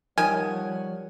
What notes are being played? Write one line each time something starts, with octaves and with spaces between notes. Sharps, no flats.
D#3 F3 G3 C#5 F#5 G#5